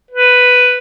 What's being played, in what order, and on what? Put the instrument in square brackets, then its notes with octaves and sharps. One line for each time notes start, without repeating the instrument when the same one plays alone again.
[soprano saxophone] B4